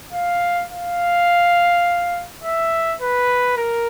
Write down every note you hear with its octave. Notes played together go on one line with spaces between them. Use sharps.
F5
F5
E5
B4
A#4